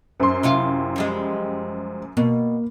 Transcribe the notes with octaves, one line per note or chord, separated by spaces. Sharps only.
F#2 C5 C6
C3 E4 F4
F3 G3 G#3
B2 A#3